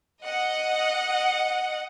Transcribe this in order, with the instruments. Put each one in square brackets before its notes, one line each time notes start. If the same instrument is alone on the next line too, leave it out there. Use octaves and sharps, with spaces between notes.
[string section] D#5 F#5